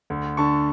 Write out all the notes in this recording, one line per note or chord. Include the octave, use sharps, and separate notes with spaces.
D2
D3 A5 C#6